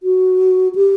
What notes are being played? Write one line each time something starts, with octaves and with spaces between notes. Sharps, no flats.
F#4
G4